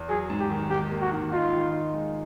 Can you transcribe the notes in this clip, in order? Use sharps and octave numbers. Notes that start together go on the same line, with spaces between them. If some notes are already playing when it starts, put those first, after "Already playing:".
Already playing: E2
F#3 G#4
G#2
G4
D#3
G#2 G4
A#3
F#4
D#3
D#4 F4
D#3
D#4
G#3